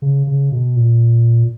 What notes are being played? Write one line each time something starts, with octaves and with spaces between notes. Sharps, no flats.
C#3
C#3
B2
A#2